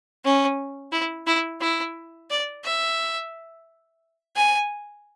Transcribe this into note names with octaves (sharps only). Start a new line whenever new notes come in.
C#4
E4
E4
E4
D5
E5
G#5